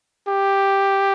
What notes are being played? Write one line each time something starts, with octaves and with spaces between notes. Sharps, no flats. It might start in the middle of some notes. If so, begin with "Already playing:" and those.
G4